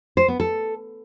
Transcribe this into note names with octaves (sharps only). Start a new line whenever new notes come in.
C5
B3
A4